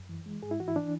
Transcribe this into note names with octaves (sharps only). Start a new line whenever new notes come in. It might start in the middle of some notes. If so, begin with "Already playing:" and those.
Already playing: F#2
E3
G#3
G#2 G#4
E4
E3 F#4
E4
E3 D4